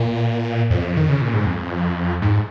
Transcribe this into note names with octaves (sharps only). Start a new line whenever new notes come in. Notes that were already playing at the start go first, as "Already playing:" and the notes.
Already playing: A#2
F2
D#3
C#3
A#2
G#2
F2
G#2